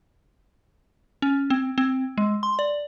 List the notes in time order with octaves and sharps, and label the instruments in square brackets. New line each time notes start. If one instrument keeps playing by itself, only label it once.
[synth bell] C#4
C4
C4
G#3
C6
D5